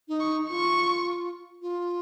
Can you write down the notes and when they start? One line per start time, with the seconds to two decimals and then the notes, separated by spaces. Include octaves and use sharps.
0.08 D#4
0.20 C#6
0.49 F4 C#6
1.62 F4